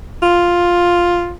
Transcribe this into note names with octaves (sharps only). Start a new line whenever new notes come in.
F4